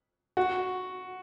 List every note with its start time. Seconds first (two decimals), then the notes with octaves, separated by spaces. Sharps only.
0.37 F#4